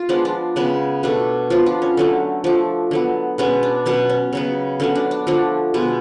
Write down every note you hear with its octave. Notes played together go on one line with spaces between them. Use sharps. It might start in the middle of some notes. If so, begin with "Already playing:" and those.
Already playing: F4
F3 G#3 B3 D4
D4
C#3 G#3 B3
B2 A3 D4
F3 B3 F4
D4
C#4
D3 F#3 A3
F3 A3 D4
D3 F#3 B3
B2 G#3 B3 C#4
D4
B2 F#3 B3 C#4
C#4
C#3 F#3 B3
D3 F#3 B3 C#4
D4
D4
D3 F3 A3 D4
B2 G#3 B3